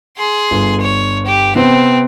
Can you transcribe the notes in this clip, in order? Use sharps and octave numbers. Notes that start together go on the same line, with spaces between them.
G#4 C6
G1
C#5
G4
C3 B3 C4